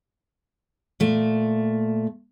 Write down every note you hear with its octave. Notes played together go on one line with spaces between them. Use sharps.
A#2 A3